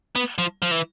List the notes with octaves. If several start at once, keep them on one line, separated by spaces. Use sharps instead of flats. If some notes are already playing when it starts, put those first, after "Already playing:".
B3
F3
F3
E3